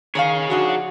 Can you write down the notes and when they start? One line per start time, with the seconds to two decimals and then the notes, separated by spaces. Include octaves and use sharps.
0.15 D#3 G#4 C#5 D5 F5
0.50 F3 D4 D#4 F#4